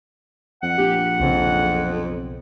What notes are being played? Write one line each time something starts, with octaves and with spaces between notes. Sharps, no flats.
F2 F#5
A#1 G4
B1 F2 C#3